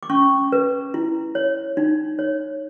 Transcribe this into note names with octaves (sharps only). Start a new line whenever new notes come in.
D6
C#4 C#6
B4
E4
C#5
D#4
C#5